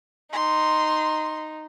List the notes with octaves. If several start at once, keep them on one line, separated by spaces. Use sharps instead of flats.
D#4 C6